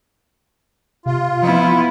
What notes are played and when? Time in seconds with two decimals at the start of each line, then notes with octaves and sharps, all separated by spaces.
1.06 C3 F4
1.42 F3 B3 E4